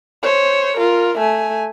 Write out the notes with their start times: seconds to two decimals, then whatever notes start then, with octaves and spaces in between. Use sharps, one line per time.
0.23 C5 C#5
0.77 F4 A#4
1.18 A3 G#5